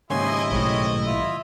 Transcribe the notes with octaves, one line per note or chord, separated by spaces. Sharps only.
D#2 G#2 C#3 E4 D#5 G#5 C6
B1 A2 G#3 C4 C#5
F4 E5